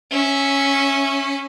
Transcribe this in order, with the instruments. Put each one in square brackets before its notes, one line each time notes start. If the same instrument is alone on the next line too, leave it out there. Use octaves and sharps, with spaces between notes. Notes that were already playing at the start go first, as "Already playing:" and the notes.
[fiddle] C#4 E5